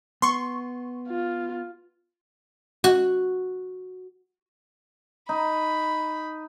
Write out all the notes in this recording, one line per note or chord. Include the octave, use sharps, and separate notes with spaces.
B3 C6 C#6
F4
F#4
D#4 B5